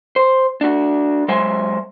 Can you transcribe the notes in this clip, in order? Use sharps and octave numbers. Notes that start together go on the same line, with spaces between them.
C5
D4 F#4
F#3 G#3 C5 E5 G#5 C6